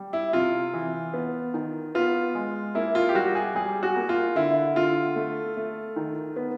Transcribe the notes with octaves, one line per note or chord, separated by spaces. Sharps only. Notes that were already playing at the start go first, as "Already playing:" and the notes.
Already playing: G3
E4
C3 F4
E3
B3
D#3
B3 F4
G#3
A#3 E4
F4
G4
G3 F#4
G#4
G3 G#4
F#4
A#3
F4
D3 E4
D3 F4
A3
A3
D#3
B3